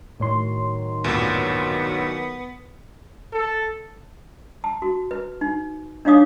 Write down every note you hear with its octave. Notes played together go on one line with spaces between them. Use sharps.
A2 D#3 F#3 C#5 C6
D2 G2 A#2 B3
A4
A5
F#4
B4
D#4
D4 D#4 C#5 F5 D6 D#6